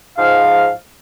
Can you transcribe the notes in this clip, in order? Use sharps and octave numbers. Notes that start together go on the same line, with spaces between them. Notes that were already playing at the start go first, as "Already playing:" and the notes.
G#2 F3 F5